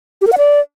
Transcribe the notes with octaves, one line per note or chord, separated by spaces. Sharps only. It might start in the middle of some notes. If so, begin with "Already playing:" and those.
G4
A#4
F#5
D5